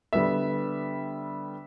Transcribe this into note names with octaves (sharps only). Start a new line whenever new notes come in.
D3 G3 B3 E5